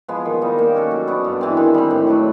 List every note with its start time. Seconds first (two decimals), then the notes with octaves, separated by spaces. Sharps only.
0.08 F3 G#3 B3
0.25 D#3
0.42 G3 A#3 D#4
0.58 A#3
0.75 C#4 F#4 A4
0.91 F#3
1.08 B3 D4
1.25 G2
1.41 E3 G#3 C4
1.57 D#3
1.74 G3 C4
1.91 A2
2.07 F#3 A3 D4